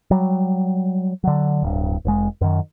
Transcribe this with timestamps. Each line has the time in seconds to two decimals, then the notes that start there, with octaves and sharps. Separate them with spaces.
0.11 F#3 G3
1.24 D3 F#3
1.63 D1 G2
2.05 F1 G#3
2.41 F#2 D#3